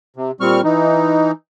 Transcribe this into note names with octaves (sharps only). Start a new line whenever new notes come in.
C3
A#2 G3 C4 C#6 F6
E3 D#4